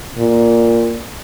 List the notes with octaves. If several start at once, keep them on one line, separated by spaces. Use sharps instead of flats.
A#2